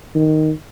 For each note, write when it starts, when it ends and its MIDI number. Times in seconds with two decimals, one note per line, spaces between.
0.15 0.51 51